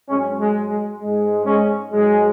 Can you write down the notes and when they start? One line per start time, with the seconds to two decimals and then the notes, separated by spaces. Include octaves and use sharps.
0.09 G#2 F#3 G#3 C#4
0.40 G#3
0.70 G#3
1.00 G#2 G#3
1.45 G#3 C#4
1.91 G#2 F#3 G#3